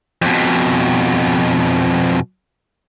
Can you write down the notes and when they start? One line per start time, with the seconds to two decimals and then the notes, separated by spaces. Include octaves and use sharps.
0.22 F2 B2